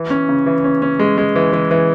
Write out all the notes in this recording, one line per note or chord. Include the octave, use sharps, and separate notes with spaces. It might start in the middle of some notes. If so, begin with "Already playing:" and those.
Already playing: E3
C#4
C#3
E3
C#4
C#4
G#3
G#3
E3
E3
E3